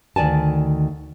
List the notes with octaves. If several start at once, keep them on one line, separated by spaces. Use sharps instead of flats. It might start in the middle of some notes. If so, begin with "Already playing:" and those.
D2 D#3 D5 G#5 A5